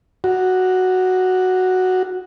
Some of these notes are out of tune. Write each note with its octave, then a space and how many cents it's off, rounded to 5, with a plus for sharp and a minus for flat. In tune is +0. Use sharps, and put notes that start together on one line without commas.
F#4 +0